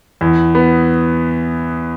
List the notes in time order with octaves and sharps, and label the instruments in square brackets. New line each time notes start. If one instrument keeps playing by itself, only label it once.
[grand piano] E2
B3